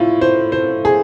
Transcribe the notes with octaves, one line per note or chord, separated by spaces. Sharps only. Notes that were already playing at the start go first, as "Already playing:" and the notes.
Already playing: A2 E4 F4
C5
C5
G#4